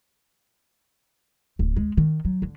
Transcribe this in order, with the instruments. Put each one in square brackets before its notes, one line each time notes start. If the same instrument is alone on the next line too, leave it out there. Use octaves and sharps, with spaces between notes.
[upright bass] D1
G#3
D#3
F#3
D3